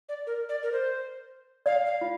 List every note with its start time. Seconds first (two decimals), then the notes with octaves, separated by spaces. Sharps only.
0.09 D5
0.27 A#4
0.49 D5
0.63 A#4
0.72 C5
1.66 D5 F5
1.86 F5
2.01 F4